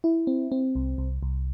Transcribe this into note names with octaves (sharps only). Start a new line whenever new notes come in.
E4
C4
C4
C2
C2
C2